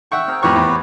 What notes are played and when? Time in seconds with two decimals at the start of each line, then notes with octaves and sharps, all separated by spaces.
0.12 E5 F#5 G5 C#6
0.28 C4 G#4 A#4
0.43 F2 A2 G4 B4 C#5 C#6
0.56 E2